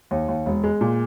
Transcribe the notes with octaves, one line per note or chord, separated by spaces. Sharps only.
D#2
D#2
E1
G#3
A#2